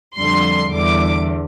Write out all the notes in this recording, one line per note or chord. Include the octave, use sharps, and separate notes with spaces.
F2 D3 G3 C6
E2 D3 G3 D6